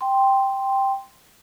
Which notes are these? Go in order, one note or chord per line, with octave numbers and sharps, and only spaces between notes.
G5 C6